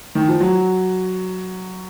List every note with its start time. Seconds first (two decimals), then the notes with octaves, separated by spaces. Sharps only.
0.15 D#3
0.28 F3
0.40 F#3